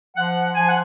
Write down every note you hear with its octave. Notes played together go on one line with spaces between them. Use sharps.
F3 F#5
F3 G#5
F#5